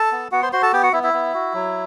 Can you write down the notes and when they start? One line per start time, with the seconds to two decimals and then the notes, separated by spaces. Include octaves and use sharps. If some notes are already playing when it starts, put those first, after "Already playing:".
Already playing: A4 A5
0.12 B3
0.31 B3 F#4 F#5
0.43 C5 C6
0.53 F#4 C5 C6
0.63 A4 A5
0.73 B3 G4 G5
0.83 F#4 F#5
0.93 B3 E4 E5
1.03 E4 E5
1.14 B3
1.34 F#4
1.54 F#3